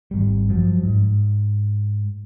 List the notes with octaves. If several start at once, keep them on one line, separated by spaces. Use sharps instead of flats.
G#1 G3
G2 F3 F#3
G#2